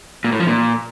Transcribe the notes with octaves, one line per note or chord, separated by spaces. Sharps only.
A#2
A2
F3
A#2